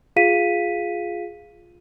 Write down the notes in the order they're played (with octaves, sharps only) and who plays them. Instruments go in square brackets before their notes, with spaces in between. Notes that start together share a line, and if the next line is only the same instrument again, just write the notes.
[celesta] F4 G#4 F5 B6 D#7